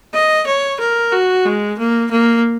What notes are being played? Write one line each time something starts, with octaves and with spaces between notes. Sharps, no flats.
D#5
C#5
A#4
F#4
G#3
A#3
A#3